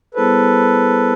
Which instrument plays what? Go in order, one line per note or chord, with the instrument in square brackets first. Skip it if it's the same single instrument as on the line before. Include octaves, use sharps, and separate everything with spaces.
[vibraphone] G3 B3 E4 G#4 C5 [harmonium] A4 B4